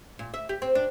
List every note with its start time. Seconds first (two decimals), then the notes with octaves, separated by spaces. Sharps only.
0.19 A#2
0.34 E5
0.49 G4
0.62 C4
0.75 D4